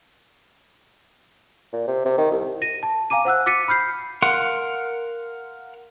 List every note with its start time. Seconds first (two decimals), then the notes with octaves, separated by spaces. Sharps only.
1.73 A#2
1.87 C3
2.05 C3
2.18 D#3
2.32 C2
2.62 A#6 D#7
2.83 A5
3.10 F5 G#5 A#5 D6 D#7
3.25 C5 F#5 E6 F#6
3.46 D6 A6 B6 C#7 D#7
3.68 B5 F6 G6 C7
4.22 A#4 F5 F#5 C6 F#6